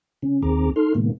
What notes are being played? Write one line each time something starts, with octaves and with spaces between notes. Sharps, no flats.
C#3 C#4
D#2 D#3 C4 G#4 A#5 D6
D#4 A4 C6 F6
A2 C3 D#3 G#3 A#3 B3